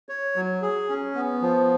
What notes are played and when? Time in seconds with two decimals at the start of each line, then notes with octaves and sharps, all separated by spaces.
0.09 C#5
0.36 F#3
0.62 G#4
0.89 C#4
1.15 B3
1.42 F3